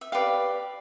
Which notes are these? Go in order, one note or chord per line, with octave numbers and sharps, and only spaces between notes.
E5
G4 B4 D5 F5